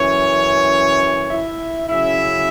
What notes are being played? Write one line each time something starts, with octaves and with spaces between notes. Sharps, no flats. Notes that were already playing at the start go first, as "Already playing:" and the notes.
Already playing: F#2 E3 C#4 C#5
E4 E5
C#3 F#3 C#4 E4 E5